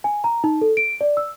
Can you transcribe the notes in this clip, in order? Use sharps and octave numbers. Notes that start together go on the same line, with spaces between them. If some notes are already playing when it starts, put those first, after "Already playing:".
G#5
A#5
D#4
A4
D7
D5
E6